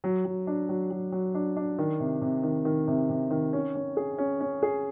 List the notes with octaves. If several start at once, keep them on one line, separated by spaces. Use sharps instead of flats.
F#3
F#3
D4
F#3
F#3
F#3
D4
D4
D#3
C3
C3
D#3
D#3
C3
C3
D#3
C#4
C#4
G#4
C#4
C#4
G#4